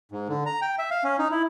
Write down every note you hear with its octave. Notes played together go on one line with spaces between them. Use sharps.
G#2
D3
A#5
G5
E5
F5
C#4
D#4
E4